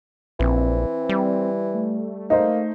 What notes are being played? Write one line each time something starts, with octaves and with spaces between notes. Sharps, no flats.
A#1 E3 C4
G3
A3
A#3 D#4 C5